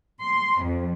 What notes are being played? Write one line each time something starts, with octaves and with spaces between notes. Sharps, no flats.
C6
F2